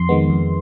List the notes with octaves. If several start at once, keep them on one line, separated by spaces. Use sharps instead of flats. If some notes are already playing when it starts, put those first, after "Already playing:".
Already playing: F2 C6
D#3 G#3 B3
F2